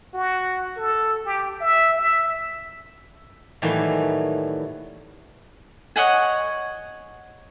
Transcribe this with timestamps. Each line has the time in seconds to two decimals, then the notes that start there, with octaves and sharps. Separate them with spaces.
0.14 F#4
0.77 A4
1.25 G4
1.61 E5
1.98 E5
3.62 A2 D#3 E3 F#3 G3 A#3
5.96 C#5 D#5 F#5 G#5